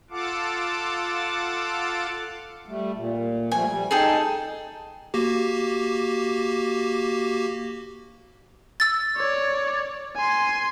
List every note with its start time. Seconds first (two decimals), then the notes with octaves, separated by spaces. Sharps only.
0.10 F4 A4 F5 F#5 A5 D6
2.66 G3 A3
2.96 A#2
3.52 F3 G3 A3 G#5
3.69 G3
3.91 D#4 G#4 A4 G5
5.14 A#3 F#4 G4
8.80 E6 A6
9.16 C#5 D5
10.16 G#5 C6